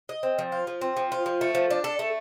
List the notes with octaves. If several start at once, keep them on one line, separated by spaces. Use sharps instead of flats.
D#5
C4
F3
F4
F3
C4
F3
F4
F3
A3
F3
D4
A4
A3